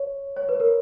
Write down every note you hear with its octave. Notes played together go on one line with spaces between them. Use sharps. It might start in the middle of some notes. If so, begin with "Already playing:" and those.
Already playing: C#5
C#5
B4
A#4